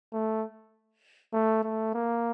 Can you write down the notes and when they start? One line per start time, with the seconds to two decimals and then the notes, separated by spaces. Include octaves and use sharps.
0.13 A3
1.33 A3
1.63 A3
1.94 A#3